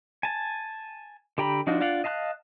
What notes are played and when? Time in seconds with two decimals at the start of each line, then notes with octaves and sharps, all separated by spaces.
0.23 G#5 A5
1.38 D3 G4 G5 A#5 B5
1.67 F3 D4 D#4 F4 F#4
1.80 D4 F4 D5 F5 F#5
2.04 D#5 F5 A5 C6 F#6